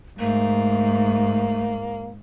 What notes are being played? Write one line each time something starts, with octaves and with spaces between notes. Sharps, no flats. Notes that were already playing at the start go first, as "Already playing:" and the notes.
G#2 A3 A#3